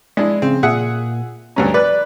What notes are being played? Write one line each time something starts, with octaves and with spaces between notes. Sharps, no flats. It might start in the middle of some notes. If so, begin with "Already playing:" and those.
G#3 D4 E4
C#3 C4
A#2 G#4 E5 F#5
D2 G2 C#4 A#5
B4 D5 F#6